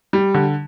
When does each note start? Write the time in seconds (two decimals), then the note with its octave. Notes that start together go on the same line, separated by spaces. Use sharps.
0.13 G3
0.34 D3